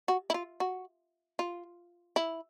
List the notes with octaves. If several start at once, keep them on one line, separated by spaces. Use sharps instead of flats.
F#4
E4
F4
F#4
F4
E4